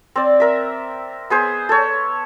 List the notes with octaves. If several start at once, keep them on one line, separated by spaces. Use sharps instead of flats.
C4 D5
A#4 E5
B3 G#4 C5
A4 C#5